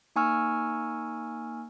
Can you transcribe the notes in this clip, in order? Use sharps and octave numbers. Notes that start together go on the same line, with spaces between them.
A#3 D#4 G#5 C#6 E6 F6